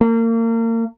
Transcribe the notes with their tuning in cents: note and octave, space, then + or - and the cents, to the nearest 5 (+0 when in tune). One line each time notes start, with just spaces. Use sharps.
A#3 -35